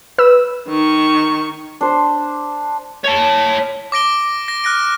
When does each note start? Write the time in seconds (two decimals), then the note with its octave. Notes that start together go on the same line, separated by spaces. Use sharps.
0.18 B4 E6
0.69 D#3 C#6
1.81 D4 C5
3.04 C#5 A5
3.92 D6 A#6 D7 G7
4.48 A#6
4.64 F6 F#6 A#6 D7